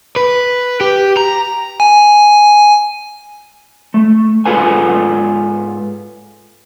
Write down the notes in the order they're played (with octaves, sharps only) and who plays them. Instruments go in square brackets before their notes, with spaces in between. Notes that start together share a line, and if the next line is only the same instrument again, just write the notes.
[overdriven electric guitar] B4
G4
A#5
[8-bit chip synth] G#5
[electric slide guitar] A3
G#2 B2 F4 A4 B4 G#5